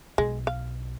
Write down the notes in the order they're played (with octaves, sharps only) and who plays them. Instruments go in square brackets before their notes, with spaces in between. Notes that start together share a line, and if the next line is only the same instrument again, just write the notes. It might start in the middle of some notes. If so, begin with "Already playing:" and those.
[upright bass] B1 [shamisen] G#3
[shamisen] F5